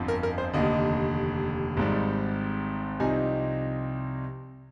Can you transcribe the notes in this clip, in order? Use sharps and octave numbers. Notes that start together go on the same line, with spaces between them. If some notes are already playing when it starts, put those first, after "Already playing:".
Already playing: G1 F2 D3 F3
A#4
A#4
C5
F1 D#2 D3 D#5
G#1 G#2 G3
C2 C3 F3 C4 D#4 G#5